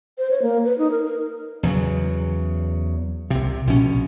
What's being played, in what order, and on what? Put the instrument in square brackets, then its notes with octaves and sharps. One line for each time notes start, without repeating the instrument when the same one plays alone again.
[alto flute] C5
C#5
A#3
B4
D#4
A#4
A#4
[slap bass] E2 C#3 F#3
C2 C3
A#1 B2 C#4